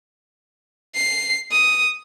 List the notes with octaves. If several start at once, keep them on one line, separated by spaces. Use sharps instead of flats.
C7
D#6